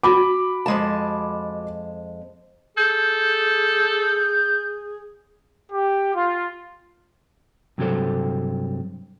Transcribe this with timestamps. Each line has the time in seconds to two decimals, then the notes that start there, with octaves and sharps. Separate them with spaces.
0.03 F#4 B5 D6
0.66 F2 G#3 A5
2.77 G#4 A4 G6
5.72 G4
6.15 F4
7.78 G2 C3 F#3 G4 A4 C5